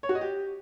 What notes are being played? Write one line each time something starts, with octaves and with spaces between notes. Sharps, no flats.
C#5
F#4
D#5
G4